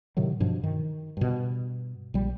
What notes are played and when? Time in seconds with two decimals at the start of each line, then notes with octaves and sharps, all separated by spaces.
0.17 A2 C3 D#3 F#3
0.40 G2 B2 F3
0.64 D#3
1.17 G2 B2
2.14 A#1 G3